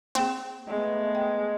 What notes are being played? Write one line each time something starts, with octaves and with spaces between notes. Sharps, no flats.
A#3 C4 G#4
G#3 A3 B3
G5